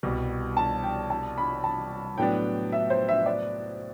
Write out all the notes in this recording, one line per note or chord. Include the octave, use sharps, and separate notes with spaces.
C2 B2 G3
A5
G5
A5
B5
A5
A2 F#3 B3 D4 G5
E5
C5
E5
D5